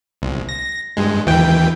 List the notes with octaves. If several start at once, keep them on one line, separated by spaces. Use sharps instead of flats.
C2
A#6
G2 G#3
D#2 E3 G5